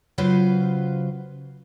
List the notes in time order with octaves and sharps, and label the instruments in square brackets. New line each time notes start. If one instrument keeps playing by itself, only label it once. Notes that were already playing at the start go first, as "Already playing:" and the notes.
[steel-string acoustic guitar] C#3 F#3 F4 B4 C5